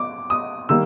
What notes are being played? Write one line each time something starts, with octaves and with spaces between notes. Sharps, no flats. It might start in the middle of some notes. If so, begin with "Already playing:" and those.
Already playing: D6
D#6
D#3 G3 A#3 E6